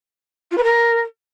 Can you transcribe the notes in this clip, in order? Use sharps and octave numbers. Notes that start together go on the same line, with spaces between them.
F4
B4
A#4